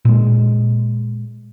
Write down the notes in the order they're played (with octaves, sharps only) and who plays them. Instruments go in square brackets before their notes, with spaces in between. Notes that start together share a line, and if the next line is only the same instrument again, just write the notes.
[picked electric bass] A#2 G#3